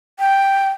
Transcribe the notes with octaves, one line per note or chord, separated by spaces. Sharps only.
G5